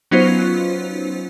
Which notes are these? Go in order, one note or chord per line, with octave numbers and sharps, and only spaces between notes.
F#3 B3 C#4 D#4 F4 C5